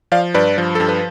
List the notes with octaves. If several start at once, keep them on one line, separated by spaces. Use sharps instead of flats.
F3 D5 F5
G2 B4 D5
F3
G2 A4
B4